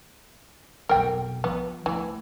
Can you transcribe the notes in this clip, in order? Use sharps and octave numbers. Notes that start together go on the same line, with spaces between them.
F1 B1 A#4 G5
F3 B3
C2 E3 A3